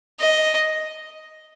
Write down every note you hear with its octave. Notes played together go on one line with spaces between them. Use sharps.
D#5